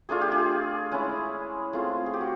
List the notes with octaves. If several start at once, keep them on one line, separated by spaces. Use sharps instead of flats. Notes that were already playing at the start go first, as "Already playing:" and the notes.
A3 D4 F4 G#4
G4
G#4
G#3 C#4 E4
A3 C4 F4 G#4
G#4
G4
F#4